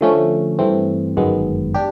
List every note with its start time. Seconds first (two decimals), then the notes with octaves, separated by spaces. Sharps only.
0.01 D3 F3 A3 C#4
0.59 G2 E3 A3 C4
1.17 G1 F#2 D#3 G#3 B3
1.74 D4 G4